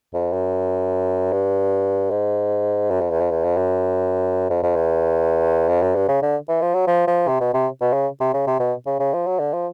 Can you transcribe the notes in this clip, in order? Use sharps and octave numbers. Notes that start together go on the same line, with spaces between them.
F2
F#2
G2
G#2
F#2
F2
E2
F2
E2
F2
F#2
F2
F2
E2
F2
F#2
G2
C#3
D3
E3
F3
F#3
F3
F3
C3
B2
C3
B2
C#3
C3
C#3
C3
B2
C#3
C#3
F3
F#3
D3
F3